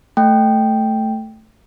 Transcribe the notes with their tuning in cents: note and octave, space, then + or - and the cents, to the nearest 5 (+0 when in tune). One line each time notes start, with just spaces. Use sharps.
A3 +0 G5 +0